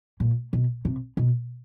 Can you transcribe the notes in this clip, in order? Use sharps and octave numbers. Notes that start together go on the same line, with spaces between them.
A#2
B2
C3
B2